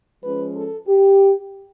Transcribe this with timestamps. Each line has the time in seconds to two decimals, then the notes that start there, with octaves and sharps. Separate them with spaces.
0.21 F3 G#3 C#4 B4
0.54 A4
0.87 G4